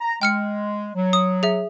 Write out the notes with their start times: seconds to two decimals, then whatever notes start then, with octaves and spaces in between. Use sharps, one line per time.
0.01 A#5
0.22 G#3 G5 F6 C#7
0.95 F#3
1.13 D#6
1.43 G#4 E5